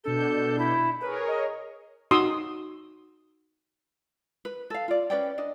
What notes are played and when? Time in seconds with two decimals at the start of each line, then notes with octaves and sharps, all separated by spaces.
0.04 B2 D4 A4 G6
0.58 E4
1.00 G#4 A#4 B4 C#5
1.27 D#5
2.11 D#4 F#4 C6 D#6 E6
4.45 B4
4.70 A4 F5
4.88 F4 D5
5.10 C#4 B4 D5 G5
5.38 D4 D#5